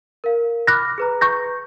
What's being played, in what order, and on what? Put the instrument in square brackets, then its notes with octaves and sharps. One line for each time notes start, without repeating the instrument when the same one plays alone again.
[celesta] A#4 F5
[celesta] B5 D6 F6 [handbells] F#6 A#6
[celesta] G#4 B4 A#5
[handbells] C#6 G6 A#6